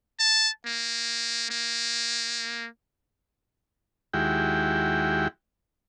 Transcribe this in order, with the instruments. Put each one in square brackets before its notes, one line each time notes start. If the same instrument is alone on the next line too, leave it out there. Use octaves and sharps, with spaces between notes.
[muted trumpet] A5
A#3
A#3
[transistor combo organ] D#2 G#3 E4 F#4 G4 G5